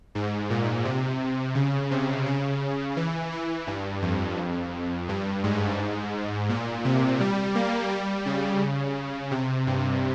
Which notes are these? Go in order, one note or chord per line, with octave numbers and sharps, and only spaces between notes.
G#2
A#2
C3
C#3
C3
C#3
E3
E3
G2
F2
G2
G#2
A#2
C3
G3
A#3
G3
C#3
C3
G2